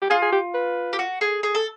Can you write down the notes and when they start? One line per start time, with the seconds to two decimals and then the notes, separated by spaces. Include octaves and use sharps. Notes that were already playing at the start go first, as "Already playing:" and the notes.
0.02 G4
0.10 F4 G#4
0.22 G#4
0.33 G4
0.54 B4
0.93 G4
0.99 F#4
1.21 G#4
1.43 G#4
1.55 A4